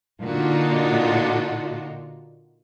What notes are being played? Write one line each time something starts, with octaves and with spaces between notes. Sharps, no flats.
A#2 D3 D4 D#4 F4 F#4